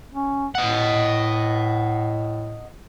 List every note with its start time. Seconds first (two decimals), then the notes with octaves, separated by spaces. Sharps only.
0.13 C#4
0.55 A2 D#5 F#5